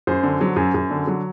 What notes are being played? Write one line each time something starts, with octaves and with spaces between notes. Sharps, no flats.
F#2 C5
D3
F#3
F#2
F#2
D3
F#3